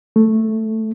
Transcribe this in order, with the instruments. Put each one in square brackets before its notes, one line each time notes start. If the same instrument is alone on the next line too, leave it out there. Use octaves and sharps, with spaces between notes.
[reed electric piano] A3